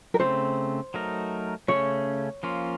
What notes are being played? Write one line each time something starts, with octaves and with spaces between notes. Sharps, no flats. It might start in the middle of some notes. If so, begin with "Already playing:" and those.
A#4
C#3 A3 C4 C5
F#3 A3 D#4 A#4
C#3 A3 C#4 C#5
F3 A#3 C#4 F4